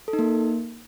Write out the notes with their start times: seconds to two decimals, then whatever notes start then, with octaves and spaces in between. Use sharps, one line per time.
0.08 A4
0.13 D#4
0.19 A#3